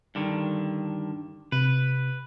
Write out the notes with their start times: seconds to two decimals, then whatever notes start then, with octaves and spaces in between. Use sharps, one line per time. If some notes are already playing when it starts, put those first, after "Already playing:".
0.15 G2 D3 D#3
1.52 C3 B4